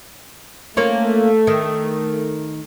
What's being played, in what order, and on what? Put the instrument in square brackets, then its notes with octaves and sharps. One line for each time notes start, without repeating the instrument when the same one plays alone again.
[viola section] A3 [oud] A#3 C#4 F4
[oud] D#3